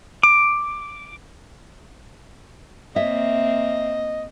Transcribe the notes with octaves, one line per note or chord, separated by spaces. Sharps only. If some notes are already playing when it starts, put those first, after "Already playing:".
D6
A#3 C4 C#5 D#5 E5